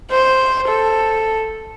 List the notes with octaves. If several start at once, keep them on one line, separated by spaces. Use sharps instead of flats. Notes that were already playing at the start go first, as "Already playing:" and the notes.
C5
A4